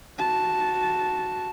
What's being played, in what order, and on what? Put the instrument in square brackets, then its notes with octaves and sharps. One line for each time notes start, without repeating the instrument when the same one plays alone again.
[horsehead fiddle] F#4 A5